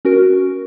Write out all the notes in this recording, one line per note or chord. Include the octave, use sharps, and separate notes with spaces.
C#4 F#4 A#4